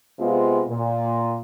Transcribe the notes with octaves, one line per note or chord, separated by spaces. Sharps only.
C3 G#3 B3 F4
A#2